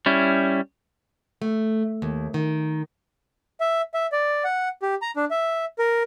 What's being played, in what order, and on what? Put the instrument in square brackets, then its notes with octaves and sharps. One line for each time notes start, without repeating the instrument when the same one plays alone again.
[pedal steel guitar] G3 C#4 E4
[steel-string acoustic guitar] A3
D#2
D#3
[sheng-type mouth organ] E5
E5
D5
F#5
G4
A#5
D4
E5
A#4